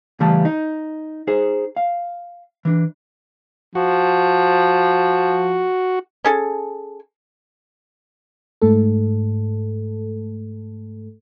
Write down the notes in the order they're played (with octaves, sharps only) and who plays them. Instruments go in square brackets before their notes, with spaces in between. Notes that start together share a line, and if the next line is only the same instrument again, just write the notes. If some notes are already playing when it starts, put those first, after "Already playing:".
[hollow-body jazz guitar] C#3 E3 G3 A3 F5 A5
D#4
D#4 G#4 C5
F5
E3 D4
[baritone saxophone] F3 [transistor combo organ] F#4
[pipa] C#4 G#4 A4
[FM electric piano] G#2 A3 A4